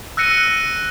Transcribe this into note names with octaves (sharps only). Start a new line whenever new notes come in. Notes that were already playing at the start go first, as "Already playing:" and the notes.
E6 F#6 A#6 C#7 D#7